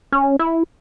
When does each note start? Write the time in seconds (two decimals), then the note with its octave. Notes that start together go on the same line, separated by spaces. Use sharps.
0.12 C#4
0.39 E4